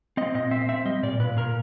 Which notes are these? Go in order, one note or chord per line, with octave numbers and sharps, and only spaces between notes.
C4 D#5
A#2 D#5
C4 E5
C4 E5
G3 D#5
A#2 D5
A#2 B4
A#2 A#4